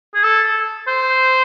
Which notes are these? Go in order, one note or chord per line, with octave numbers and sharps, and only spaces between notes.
G#4
A4
C5